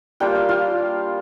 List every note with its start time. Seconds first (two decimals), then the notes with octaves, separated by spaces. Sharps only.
0.20 G3 A#3 D4 F4 G5
0.35 F5
0.49 F4